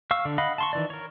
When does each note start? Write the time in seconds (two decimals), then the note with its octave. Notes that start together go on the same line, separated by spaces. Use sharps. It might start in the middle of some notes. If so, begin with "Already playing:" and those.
0.11 F5 C#6 E6
0.25 D3 D4
0.38 D#5 F5 F#5 B5
0.58 A5 C6 C#6
0.73 D#3 E3 D5
0.90 A#4 C#5